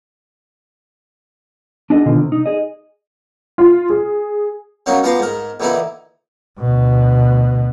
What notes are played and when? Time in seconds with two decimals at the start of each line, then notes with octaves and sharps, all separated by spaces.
1.90 D4 D#4 F#4 G#4 A4 D#5
2.06 B2 D3 D#3 F4
2.20 C3
2.32 D#4
2.46 G#4 D#5
3.58 F4
3.90 G#4
4.86 F#3 A#3 C#4 D#4 F#4
5.03 F3 B3 B4 A#5 C6 D6
5.19 G#2 A#4
5.60 A#1 D3 E3 D#4 E4 B5
6.59 D2 B2